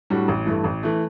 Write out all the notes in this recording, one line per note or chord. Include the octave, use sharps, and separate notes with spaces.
A2 G3 D4 F#4
A1
G2 E3 A3
A1
E3 A3